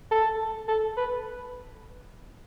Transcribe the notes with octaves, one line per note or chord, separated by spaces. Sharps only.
A4
A4
B4